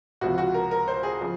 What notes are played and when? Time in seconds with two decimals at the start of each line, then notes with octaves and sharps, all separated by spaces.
0.21 C#2 C3 F3 F#4
0.38 F#4
0.54 A#4
0.71 A#4
0.88 C5
1.03 G#4
1.21 C#3 F3